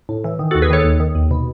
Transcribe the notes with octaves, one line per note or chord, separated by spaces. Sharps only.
A2
E3
D#3
D#2 F#4 A4
G#4 B4
D#3 A4 C#5
D#2
D#3
D#2
B2